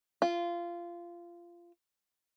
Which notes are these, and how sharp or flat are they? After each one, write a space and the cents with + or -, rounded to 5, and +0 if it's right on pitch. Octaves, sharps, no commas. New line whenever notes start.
F4 -20